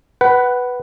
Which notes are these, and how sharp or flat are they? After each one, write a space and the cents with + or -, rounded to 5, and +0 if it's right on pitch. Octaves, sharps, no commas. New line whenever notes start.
B4 +0 F#5 +20